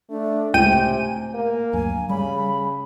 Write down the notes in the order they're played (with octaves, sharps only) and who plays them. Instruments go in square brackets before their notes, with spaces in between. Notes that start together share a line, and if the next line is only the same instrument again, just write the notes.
[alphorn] A3 [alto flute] D4
[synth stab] C#2 G5 D#7 [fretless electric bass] A2 [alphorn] C3 [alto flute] G#5
[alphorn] A#3
[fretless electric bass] D2 G2 F#3 [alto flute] G#5
[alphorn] C#3 [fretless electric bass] G3 [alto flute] B5